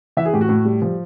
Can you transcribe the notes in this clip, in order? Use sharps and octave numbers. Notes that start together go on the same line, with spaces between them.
E3 E5
G#4
A2 G4
F#4
A2
G3
F3